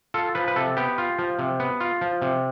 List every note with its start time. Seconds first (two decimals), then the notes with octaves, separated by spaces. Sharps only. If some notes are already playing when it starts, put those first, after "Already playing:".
0.14 F4 A4
0.35 F3 B4
0.48 B4
0.56 C3 A4
0.77 B3 G4
0.98 F4
1.19 F3
1.39 C3
1.60 B3
1.80 F4
2.01 F3
2.22 C3